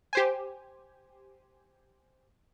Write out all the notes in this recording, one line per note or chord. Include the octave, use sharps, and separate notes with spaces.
G4 C5 G#5